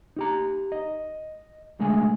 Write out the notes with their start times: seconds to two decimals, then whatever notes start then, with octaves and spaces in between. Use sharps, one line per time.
0.16 D#4 G4 A#5
0.72 D#5
1.79 B1 D3 G#3 A3 G#5